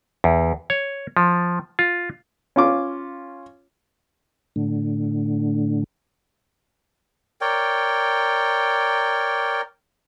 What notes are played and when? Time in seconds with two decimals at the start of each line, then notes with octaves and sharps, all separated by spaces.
0.24 E2
0.70 C#5
1.17 F3
1.79 F4
2.56 C#4 F4 D6
4.56 A2 D3
7.41 A#4 C#5 D5 G5